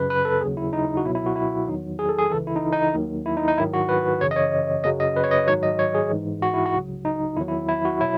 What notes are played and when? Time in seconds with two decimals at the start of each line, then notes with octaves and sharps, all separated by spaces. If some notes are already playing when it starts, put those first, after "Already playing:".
Already playing: F#2 C#3 F#3 B4
0.10 B4
0.25 A4
0.41 D#2 C#3 F#3 G#4
0.57 E4
0.73 D#4
0.97 F#4
1.04 C#2 B2 F#3 E4
1.15 E4
1.26 F#4
1.36 E4
1.67 E2 D#3 F#3 D#4
1.99 G#4
2.09 A4
2.18 G#4
2.31 C#2 C#3 E3 A4
2.47 E4
2.56 D#4
2.73 D#4
2.94 D#2 D#3 F#3
3.26 E4
3.37 D#4
3.48 D#4
3.58 G#2 D#3 F#3 E4
3.74 F#4
3.89 B4
4.20 F#2 C#3 E3 C#5
4.31 D#5
4.36 C#5
4.84 F#2 C#3 F#3 D#5
5.00 D#5
5.16 B4
5.24 C#5
5.31 D#5
5.47 G#2 D#3 F#3 C#5
5.63 D#5
5.79 C#5
5.95 G#4
6.10 G#2 E3
6.42 F#4
6.54 E4
6.65 F#4
6.73 C#2 C#3 F#3
7.05 D#4
7.37 E2 D#3 F#3 E4
7.48 E4
7.68 E4
7.85 F#4
8.01 B2 F#3 E4